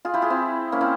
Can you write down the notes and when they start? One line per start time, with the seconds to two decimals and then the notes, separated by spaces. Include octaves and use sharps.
0.05 F4 G#4
0.14 E4 G4
0.22 F4 G#4
0.30 C4 E4
0.72 A#3 C#4
0.81 C4 E4